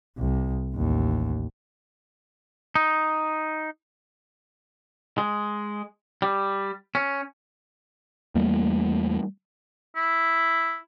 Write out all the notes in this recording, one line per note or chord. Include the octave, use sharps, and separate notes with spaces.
C2
A1 D#2
D#4
G#3
G3
C#4
E2 G3 A3 A#3
E4